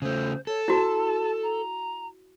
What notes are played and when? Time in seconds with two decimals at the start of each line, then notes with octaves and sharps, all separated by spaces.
0.02 C#3 A3 C5
0.47 A4 C#5
0.68 E4 F#4 A5
1.43 A#5